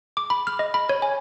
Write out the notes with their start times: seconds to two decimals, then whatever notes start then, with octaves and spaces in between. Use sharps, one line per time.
0.17 D6
0.30 B5
0.47 F6
0.59 D#5
0.74 B5
0.89 C#5
1.02 G#5